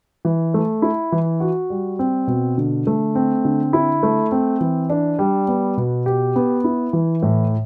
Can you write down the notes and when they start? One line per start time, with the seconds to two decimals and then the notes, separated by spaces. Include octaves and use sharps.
0.25 E3
0.54 A3
0.82 E4
1.12 E3
1.40 F#4
1.70 G3
1.99 C4
2.27 B2
2.58 D3
2.87 A3
3.15 C4
3.45 D3
3.73 E4
4.03 A3
4.32 C4
4.61 E3
4.90 D4
5.19 G3
5.48 B3
5.77 B2
6.06 G4
6.36 B3
6.64 E4
6.93 E3
7.22 A2